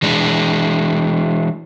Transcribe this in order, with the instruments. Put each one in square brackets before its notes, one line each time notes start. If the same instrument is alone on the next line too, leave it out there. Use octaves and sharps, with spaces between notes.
[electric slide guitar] E3 G#3 D4